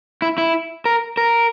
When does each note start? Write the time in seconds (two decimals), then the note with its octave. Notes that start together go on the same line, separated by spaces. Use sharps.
0.22 E4
0.38 E4
0.85 A#4
1.17 A#4